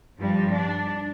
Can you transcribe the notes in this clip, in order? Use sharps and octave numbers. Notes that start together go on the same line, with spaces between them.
G2 F3 G3
D4